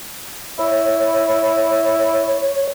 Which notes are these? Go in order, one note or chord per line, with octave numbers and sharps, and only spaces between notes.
E4 C#5